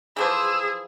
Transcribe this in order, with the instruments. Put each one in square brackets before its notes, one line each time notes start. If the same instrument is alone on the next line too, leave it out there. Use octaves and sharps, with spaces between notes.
[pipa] E3 F3 C5 [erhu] G#4 [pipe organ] E6